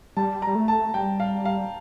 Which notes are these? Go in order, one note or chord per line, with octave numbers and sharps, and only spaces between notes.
G3 A5
A#5
G3
A3
A5
G3 G5
F5
F5